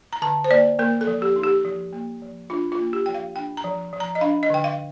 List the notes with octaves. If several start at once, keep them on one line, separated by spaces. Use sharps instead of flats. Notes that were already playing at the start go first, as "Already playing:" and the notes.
A#5
D3 A5
C5
A#3 D5
A#3 A#4
A4
F3
G4
D#4
G4
F3
A#3
F3
D4 F4
F4
A#3
G4
F3 G5
F5
D4 G5
A#5
F3
F3
A#5
D#5
D4 F5
D#5
D3 G5
F5